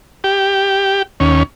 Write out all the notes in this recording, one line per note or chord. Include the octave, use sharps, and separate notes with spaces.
G4
D#2 C#4